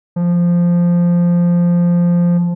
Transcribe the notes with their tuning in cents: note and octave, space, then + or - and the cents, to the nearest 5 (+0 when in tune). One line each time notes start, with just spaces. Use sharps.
F3 -5